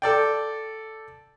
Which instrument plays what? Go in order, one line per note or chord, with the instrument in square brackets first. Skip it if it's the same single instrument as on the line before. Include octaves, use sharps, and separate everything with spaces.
[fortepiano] A4 D5 G5